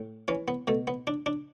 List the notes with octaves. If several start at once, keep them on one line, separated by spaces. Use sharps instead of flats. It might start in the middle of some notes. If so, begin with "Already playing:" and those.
Already playing: A2
E3 C#4
B3
B2 A3
B3
D4
D4